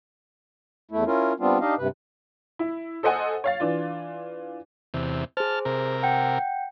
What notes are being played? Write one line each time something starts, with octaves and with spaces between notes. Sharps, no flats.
E2 A3 E4
C#4 E4 F4 A#4
G3 B3 C4 D4 F4
D4 D#4 G4 D#5 F5
G2 C3 B4
E4
A4 C5 D#5 F#5 G#5
C#5 F5 A6
E3 D4 F4
E2 C3
G#4 C5 A5 F6
C3 A#4
F#5 G5